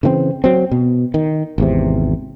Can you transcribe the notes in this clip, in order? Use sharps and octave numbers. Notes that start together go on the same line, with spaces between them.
C#3 E3 G3 C4
F#3 C4
B2
D#3
G#1 E2 C3